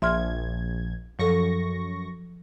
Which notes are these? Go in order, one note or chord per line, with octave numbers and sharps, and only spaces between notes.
A#1 E5 C6 F6 G#6
F#2 F3 A4 C#6 A#6